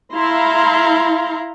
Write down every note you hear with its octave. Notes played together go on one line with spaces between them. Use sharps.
E4 F5 A#5 C6